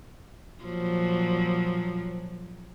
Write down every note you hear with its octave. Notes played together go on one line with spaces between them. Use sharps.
A#2 F3 F#3